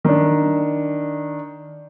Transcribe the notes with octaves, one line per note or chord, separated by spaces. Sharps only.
D#3 D4